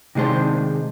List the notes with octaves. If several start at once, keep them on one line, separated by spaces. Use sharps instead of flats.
C3 D#3 G#3 D4 C5